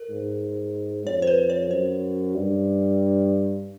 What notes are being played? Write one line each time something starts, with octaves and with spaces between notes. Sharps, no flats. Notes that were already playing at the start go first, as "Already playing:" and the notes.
Already playing: A#4
G#2
F2 C#5
C5
B4
C#5
F#2 C5
G2